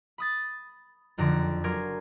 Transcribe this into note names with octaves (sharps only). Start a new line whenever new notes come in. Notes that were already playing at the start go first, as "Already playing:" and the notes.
B5 D#6 A6
F#1 F2 D3 A#5 D6
F#3 A#4 G#5 C6 D6 G#6